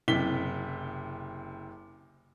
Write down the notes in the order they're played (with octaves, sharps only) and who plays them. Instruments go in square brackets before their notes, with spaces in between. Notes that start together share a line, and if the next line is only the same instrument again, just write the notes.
[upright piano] F#1 C3 B6 G7